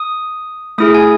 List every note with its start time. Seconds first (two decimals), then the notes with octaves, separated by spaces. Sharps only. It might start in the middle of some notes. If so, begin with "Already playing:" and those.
Already playing: D#6
0.78 A3 E4 G#4 D#6
0.94 G#5